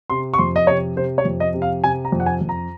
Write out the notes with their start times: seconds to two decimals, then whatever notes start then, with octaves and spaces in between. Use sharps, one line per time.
0.10 C3 C6
0.34 C#6
0.38 F2 C6
0.56 D#5
0.67 C3 C#5
0.96 C3 C5
1.18 C#5
1.25 F2
1.40 D#5
1.54 C3
1.62 F5
1.84 C3 G#5
2.05 A#5
2.12 F2
2.20 F#5
2.26 G#5
2.41 F2
2.49 A#5